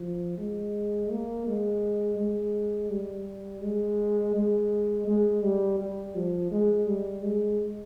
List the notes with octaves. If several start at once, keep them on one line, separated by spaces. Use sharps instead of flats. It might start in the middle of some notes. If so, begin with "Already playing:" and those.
Already playing: F3
G#3
A#3
G#3
G#3
G3
G#3
G#3
G#3
G3
G3
F3
G#3
G3
G#3